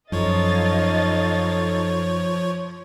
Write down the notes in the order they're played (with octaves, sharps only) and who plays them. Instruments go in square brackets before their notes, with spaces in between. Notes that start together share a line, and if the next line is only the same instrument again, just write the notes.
[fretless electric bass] F#2 [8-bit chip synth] F3 C#5 [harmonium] D#4 A4 [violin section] D#5 F5 A6